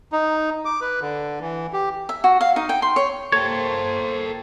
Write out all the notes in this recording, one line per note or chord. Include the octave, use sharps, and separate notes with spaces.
D#4
D6
B4
D3
E3
G4
E5
F#4
F5
D#4
G5
C6
C#5
A#3 A4 A#4 C5 C#5 G5